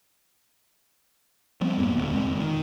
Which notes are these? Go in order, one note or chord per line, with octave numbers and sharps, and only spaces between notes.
F3 G3 B3 C4
F2 G#2 A#3 B3
D#1 D2
A#2 G#3 C4
E1 F2 D#3
D#3